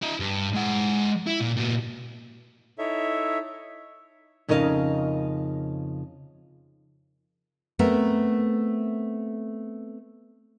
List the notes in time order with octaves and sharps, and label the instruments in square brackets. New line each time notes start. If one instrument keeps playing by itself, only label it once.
[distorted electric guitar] E4 D#5
G2
G#3 F#5
E4
A#2
A#2 F#4
[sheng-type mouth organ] D#4 E4 A4 C#5 E5
[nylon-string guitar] F2 C#3 D#4 A#4 D#5 F5
A3 B3 C4 A#4